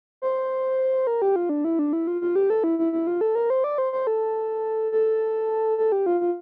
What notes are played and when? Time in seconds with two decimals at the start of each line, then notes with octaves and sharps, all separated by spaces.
0.22 C5
1.07 A#4
1.22 G4
1.36 F4
1.49 D4
1.65 E4
1.79 D4
1.93 E4
2.07 F4
2.21 F4
2.36 G4
2.50 A4
2.64 E4
2.79 E4
2.93 E4
3.07 F4
3.21 A4
3.35 A#4
3.50 C5
3.64 D5
3.78 C5
3.93 C5
4.07 A4
4.92 A4
5.78 A4
5.92 G4
6.06 F4
6.21 F4